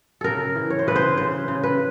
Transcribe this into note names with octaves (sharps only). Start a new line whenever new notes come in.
C#3 A4 A#4
E3
C#5
C5
C#3 B4
C5
C#3 C5
C#3
B4